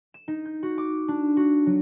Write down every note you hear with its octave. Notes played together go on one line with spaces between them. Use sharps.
E7
D#4
G6
F#4
D6
D4
F#4
F#3